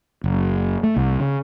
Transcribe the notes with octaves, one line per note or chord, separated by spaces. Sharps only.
F#1
A3
C2
C#3